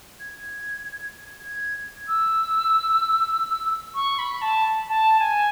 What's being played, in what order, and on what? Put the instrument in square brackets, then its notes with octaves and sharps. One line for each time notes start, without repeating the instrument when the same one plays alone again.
[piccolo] G#6
G#6
E6
C#6
B5
A5
A5
G#5